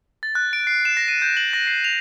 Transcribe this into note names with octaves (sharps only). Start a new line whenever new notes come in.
A6
F#6
D7
C7
E7
A#6
D#7
G6
F#7
A#6
C7
F7